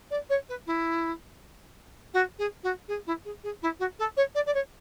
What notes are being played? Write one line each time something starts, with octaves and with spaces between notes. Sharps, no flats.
D5
C#5
B4
E4
F#4
G#4
F#4
G#4
E4
G#4
G#4
E4
F#4
A4
C#5
D5
D5
C#5